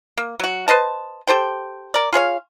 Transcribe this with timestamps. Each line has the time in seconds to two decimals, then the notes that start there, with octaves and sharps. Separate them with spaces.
0.17 A#3
0.39 F#3 F#4
0.68 B4 C5 D#5 A5
1.27 G4 A4 C5 G5
1.94 A#4 D5
2.13 F4 G#4 C#5 F5